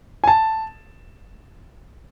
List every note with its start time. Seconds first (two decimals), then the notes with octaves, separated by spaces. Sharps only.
0.24 G#5
0.27 A5